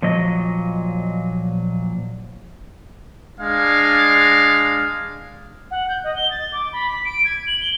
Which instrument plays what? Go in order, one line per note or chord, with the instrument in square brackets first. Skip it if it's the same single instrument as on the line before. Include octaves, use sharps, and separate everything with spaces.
[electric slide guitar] A#2 F3 F#3 D#5
[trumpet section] G#3 D4 F5
[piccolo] F#5
G6
D#5
G7
A6
D6
B5
B6
D7
G#6
F#7
G7